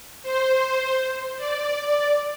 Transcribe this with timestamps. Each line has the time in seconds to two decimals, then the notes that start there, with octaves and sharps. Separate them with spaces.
0.23 C5
1.37 D5